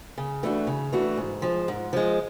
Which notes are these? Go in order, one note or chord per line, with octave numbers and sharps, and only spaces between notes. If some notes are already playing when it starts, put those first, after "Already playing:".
C#3
E3 A3 D4 F#4
C#3
E3 A3 D4 F#4
G#2
F3 G#3
G#2
F3 G#3